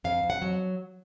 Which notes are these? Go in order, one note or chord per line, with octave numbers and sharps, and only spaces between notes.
F2 F5
F2
F#5
F#3